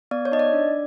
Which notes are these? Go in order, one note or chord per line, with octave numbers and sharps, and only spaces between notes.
B3 D5
C#5
D#4 D#5
D5
D4